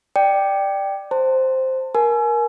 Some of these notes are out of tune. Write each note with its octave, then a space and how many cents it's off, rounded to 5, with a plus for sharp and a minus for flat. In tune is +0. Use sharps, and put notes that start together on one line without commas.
D5 +10 G5 +0
C5 +0 A5 +30
A#4 +15 G#5 +30